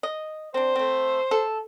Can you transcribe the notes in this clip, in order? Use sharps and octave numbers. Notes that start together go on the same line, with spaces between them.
D#5
C4 D4 C5
A3 C4
A4